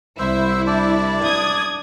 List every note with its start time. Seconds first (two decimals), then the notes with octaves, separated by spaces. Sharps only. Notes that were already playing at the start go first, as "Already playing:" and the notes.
0.19 C2 E4 C5 E5
0.67 D4 D5
1.23 D#6 G#6